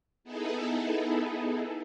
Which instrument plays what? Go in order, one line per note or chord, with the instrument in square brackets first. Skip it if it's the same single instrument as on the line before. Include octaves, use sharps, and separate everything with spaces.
[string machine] B3 D#4 E4 G#4 A4